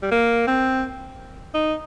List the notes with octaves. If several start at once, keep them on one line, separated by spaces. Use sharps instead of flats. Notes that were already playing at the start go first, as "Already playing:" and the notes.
G3
A#3
C4
D#4